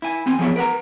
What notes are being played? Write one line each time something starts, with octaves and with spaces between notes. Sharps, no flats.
E4 G#5
E2 C4 G#5 C6
F3 B3 G#4 C#5 E5
A#4 B4 F#5 A#5